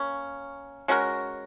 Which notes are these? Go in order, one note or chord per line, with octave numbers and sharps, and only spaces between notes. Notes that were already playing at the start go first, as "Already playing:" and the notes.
Already playing: A#3 C#4
G#3 C#4 F#4 A#4